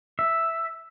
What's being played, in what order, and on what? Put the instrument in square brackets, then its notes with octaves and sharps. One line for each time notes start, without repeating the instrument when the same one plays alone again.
[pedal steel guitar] E5